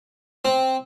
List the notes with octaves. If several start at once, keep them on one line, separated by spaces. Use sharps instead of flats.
C4